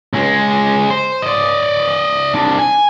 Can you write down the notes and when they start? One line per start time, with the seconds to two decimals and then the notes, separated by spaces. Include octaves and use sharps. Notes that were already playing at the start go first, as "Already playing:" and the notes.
0.14 C#2 G#3
0.90 C5
1.22 D5 D#5
2.34 C2 D4
2.59 G#5